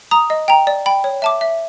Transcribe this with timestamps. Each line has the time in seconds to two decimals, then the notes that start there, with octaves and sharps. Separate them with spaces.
0.11 A#5 D#6
0.30 D#5
0.48 G5 A#5
0.67 D5
0.86 G5 B5
1.04 C#5
1.22 E5 A5 D6
1.41 E5